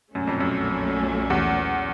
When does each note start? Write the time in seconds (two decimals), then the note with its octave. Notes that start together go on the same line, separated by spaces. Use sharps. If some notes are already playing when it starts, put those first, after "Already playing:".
0.15 B1 F#2 A#2 F#3 A3 C#4
0.27 F2
0.40 F#2
1.30 E2